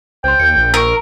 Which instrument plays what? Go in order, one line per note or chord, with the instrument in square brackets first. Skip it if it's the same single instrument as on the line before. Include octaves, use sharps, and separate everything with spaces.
[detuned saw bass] C#2 [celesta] C5 C6 [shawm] G5
[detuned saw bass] D#2 [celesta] G6 C#7
[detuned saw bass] A#1
[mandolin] A#4 [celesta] C#6 E6